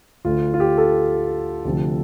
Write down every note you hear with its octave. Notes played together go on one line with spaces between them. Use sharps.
D2 D3 A3 F4
F4
G4
A4
D2 C3 F3